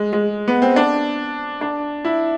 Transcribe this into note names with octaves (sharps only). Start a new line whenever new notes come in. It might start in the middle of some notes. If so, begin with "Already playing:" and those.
Already playing: G#3
G#3
B3
C4
D4
D4
E4